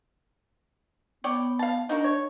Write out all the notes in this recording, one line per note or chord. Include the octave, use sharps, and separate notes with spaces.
B3 C#5 D5 G5
F5 A5
D4 D#4 F#4 A#4
C#5